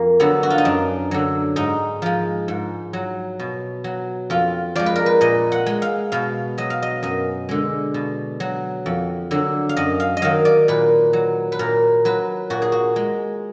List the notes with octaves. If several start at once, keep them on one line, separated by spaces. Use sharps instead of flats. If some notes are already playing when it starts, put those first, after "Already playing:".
Already playing: F2 A#3
D3 F#3 B3
F#4
F4
D#4
F#2 D4
D3 F#3
G#2 D#4
F3 G#3
G#2
F#3
B2
F#3
F2 F4
F3 G#3 D5
B4
A#4
B4
A#2 D#5
F#5
G#3
F5
B2 F5
F#3 D#5
F5
D#5
F#2 D#5
D3 G#3
B2
F#3
F2
D3 F#3
F5
F#2 D#5
F5
D#5
D#3 F#3 F5
D5
A#2 B4
F#3
B4
A#2 A#4
F#3 B4
A#2 F#4
G#4
F#4
G#3